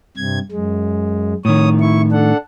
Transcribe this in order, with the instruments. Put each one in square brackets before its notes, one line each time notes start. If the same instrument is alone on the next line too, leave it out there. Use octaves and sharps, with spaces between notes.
[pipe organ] G2 C3 G#6
F#2 G#3
[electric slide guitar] A2 D#3 [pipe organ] C#5 D#6
[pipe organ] E4 C#6
D4 A4 F#5